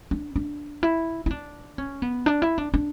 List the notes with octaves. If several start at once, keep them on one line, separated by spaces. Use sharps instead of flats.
D4
D4
E4
E4
D4
C#4
B3
D4
E4
D4
D4